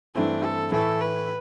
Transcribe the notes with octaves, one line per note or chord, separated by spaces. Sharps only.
G2 E3 A3 C4 D4 E4
A4
A2 E3 A3 E4 A4
B4